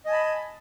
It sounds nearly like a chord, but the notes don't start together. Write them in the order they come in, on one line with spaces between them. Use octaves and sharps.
D#5 G#5 A5 B5